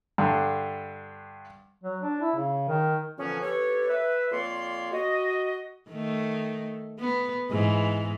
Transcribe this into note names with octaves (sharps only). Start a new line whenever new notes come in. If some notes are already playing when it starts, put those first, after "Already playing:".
G2 D3
F#3
D4
E4
C#3
D#3
A#2 D3 E3 F3 B3 C#4
B3 G4 A4 B4 C#5
B4 E5
F2 A#3 C#5 D5 C6
F#4 D#5
D#3 A3
B3
G#2 E3 B3